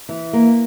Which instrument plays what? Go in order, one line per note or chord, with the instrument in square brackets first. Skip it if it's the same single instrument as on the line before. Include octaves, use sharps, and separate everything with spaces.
[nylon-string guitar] E3
A#3